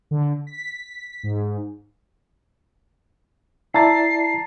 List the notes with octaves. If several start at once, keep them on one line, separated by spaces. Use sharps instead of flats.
D3
B6
G#2
E4 D5 A5 A#5 A6 C7